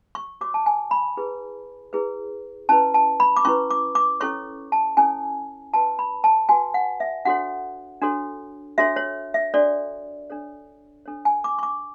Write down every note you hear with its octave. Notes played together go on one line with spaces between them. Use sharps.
C#6
F#4 C#5 D6
A5
G#5
B5
E4 G#4 B4
E4 G#4 B4
C#4 E4 B4 A5
A5
B5
D6
C#4 E4 B4 C#6
D6
D6
C#4 E4 A4 C#5 C#6
A5
C#4 E4 A4 C#5 G#5
F#4 B4 A5
B5
A5
F#4 B4 G#5
F#5
E5
D4 F#4 A4 C#5 F#5
D4 F#4 A4 C#5
D4 F#4 A4 C#5 E5
C#5
E5
D4 F#4 A4 C#5 D5
D4 A4 C#5
D4 A4 C#5
G#5
D6
C#6
D6